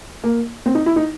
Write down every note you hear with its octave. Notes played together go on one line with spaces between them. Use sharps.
A#3
C4
D#4
E4
D#4